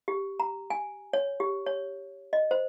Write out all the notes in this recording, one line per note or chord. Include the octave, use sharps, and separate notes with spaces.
G4
A#5
G#5
C#5
G4
C#5
D#5
C5